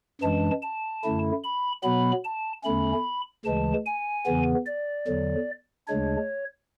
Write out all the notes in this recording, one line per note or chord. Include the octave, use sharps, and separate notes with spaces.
F#2 E3 G#3 D4 A5
A5
F#2 D3 A3 E4
B5
B2 F#3 B3 B5
A5
E2 D3 A3 C#4 B5
D2 C#3 E3 G#3 A5
G#5
E2 C#3 E3 B3
D5
E2 D3 F#3
D2 C#3 G#3 D4 C#5